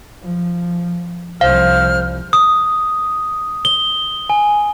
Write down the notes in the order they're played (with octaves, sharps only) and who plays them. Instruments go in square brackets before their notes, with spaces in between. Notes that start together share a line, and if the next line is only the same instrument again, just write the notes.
[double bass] F3
[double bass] C2 F3 [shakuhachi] C5 [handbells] F5 [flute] F6
[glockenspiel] D#6
G7
G#5